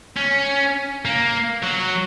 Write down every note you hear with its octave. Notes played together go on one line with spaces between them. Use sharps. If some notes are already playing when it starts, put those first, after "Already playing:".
C#4
A#3
F#3